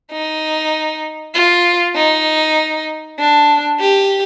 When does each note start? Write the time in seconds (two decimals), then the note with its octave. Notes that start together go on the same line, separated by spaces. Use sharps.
0.12 D#4
1.35 F4
1.96 D#4
3.19 D4
3.80 G4